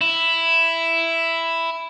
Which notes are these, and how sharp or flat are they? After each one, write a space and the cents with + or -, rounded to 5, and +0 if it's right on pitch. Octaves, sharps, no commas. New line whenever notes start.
E4 +5